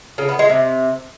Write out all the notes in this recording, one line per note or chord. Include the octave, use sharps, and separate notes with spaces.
C#3
B3
G#3
C3